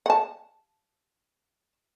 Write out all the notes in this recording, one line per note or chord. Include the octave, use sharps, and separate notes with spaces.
F#5 A5